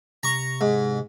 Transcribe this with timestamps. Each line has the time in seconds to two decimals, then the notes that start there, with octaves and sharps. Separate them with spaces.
0.23 C3 A#5 C#6
0.61 G#2